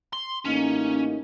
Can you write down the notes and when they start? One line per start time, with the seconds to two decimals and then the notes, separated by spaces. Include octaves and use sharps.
0.13 C6
0.46 A1 A#3 C#4 D#4